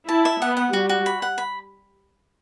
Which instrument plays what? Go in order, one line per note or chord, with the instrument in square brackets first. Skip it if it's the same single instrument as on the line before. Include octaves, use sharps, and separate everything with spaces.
[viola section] E4 [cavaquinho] A5
[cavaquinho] E5
[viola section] B3 [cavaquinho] F#5
[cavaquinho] F#5
[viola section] G3 [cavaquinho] F#4
[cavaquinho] F#4
B5
F#5
B5